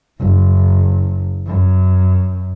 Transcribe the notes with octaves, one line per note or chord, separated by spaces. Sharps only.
F#1
F#2